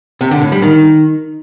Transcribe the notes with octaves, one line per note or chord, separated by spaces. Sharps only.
C3
D3
A2
G3
D#3